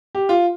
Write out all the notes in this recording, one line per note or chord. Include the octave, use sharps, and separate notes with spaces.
G4
F4